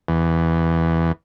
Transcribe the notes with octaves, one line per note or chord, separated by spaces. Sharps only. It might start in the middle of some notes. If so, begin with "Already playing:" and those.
E2